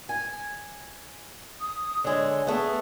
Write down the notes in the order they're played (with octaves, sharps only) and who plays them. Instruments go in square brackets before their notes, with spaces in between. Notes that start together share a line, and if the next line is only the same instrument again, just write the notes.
[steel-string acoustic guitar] G#5
[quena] D#6
[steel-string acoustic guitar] D3 G#3 [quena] C#5
[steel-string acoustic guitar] A3 B3 [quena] G#4